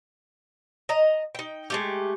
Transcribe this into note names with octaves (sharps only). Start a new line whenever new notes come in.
D#5 A#5
D#4 G5
G#3 A3 G4